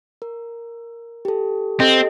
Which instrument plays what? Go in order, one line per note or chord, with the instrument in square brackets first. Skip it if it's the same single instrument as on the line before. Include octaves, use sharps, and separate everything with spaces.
[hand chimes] A#4
G4 A4
[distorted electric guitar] C4 [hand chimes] G4 A4 D#5